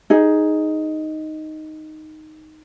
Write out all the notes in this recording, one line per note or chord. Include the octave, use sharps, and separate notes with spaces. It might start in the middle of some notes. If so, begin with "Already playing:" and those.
D#4 G#4